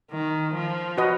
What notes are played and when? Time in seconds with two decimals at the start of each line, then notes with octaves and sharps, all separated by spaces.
0.11 D#3
0.54 F3
0.98 F#4 B4 D#5